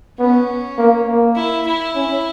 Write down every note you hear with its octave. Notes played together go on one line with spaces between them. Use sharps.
B3 C#4
A#3
A#3
E4
E4
C#4